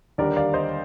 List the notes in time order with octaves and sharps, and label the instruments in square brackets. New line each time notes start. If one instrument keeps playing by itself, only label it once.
[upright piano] D#2 D3 G3 D4 A#4 D5
D5 F5
C5 D#5